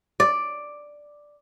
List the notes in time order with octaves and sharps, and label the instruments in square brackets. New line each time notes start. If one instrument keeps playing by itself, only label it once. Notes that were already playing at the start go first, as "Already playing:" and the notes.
[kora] D5